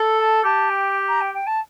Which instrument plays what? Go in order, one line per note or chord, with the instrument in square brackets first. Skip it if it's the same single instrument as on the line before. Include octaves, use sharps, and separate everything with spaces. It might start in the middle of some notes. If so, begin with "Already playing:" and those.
Already playing: [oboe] A4
[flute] A5
[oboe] G4 [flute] A5
[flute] G5
A#5
G5
G5
A5